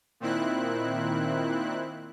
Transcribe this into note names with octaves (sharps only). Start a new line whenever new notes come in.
A#2 D#3 C4 E4 F#6